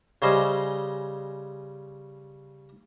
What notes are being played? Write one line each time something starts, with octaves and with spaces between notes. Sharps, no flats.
C#3 G3 C5 D#5 G#5